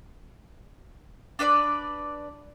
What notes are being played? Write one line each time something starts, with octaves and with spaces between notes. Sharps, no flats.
D4 B4 C5 D5